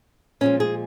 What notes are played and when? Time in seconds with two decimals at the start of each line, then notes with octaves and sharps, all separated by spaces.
0.41 A#2 F3 G#3 C#4
0.60 G#4